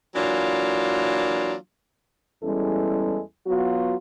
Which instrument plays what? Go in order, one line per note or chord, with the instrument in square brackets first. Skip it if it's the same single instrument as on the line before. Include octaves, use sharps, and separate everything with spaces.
[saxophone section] E3 F#3 A#3 D4 F4
[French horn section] E2 G3 G#3 C#4 E4 A4
F#3 B3 F4 F#4